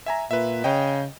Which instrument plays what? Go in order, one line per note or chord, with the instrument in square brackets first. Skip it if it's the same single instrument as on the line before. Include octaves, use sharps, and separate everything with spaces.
[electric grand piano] E5 G#5 A#5
[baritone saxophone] A#2 [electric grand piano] B4 E5
[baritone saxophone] C#3 [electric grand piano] D#5 G5